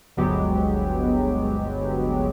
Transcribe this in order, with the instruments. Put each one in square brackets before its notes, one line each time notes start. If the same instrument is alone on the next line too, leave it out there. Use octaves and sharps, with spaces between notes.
[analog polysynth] G1 D2 F#3 G#3 B3 G4